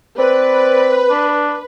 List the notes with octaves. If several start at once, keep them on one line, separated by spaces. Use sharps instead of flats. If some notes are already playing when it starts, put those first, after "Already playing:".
C4 B4 D5
D4